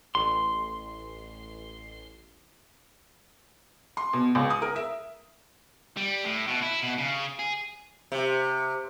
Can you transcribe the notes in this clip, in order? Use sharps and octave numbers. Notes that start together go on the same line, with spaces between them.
A1 C6
C6
B2
C#2
D#6
A#4
E5
G3
A2
B2
E4
B2
C#3
G#4
C3